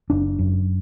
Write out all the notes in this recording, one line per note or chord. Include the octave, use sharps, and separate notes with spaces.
F#1 D4
F#2